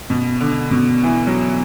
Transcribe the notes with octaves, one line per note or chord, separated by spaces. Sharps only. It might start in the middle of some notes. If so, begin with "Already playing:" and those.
B2
D3
B2
E3
F#3